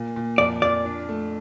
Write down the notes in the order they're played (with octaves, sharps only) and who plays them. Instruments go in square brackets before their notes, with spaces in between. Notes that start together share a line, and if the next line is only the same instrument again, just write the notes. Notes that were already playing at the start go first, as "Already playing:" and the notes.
Already playing: [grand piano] A#2
A#2
[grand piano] F2 [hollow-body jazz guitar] D5
[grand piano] F2 [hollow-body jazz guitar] D5
[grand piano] D4
A3